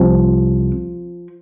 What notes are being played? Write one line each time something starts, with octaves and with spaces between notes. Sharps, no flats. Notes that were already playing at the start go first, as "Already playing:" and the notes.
Already playing: C2 C3 F3